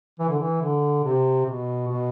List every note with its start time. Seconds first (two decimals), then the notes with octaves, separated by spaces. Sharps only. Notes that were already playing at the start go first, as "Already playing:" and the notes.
0.19 E3
0.29 D3
0.39 E3
0.62 D3
1.04 C3
1.46 B2
1.88 B2